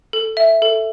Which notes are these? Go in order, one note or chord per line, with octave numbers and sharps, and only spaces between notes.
A4
E5
A4